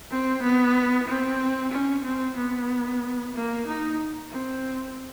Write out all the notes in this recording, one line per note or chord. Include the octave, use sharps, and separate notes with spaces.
C4
B3
C4
C#4
C4
B3
A#3
D#4
C4